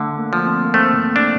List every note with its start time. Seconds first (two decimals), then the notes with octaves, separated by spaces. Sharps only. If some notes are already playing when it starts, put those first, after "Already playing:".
Already playing: D3 A3
0.18 A#3
0.33 F3
0.46 C4
0.65 A#3
0.74 A3 C4
1.16 D4